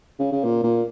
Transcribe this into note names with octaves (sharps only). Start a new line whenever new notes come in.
C#3
C#3
A#2
A#2